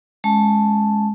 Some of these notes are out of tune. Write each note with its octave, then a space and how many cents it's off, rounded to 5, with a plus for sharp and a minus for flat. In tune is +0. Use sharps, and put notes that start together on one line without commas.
G#3 +10 C#4 +0 A5 +0